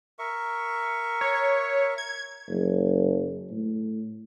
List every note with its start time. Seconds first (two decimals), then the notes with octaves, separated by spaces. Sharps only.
0.19 A#4 E5 C#6
1.21 C#5
1.98 G#6
2.49 F#1
3.51 A2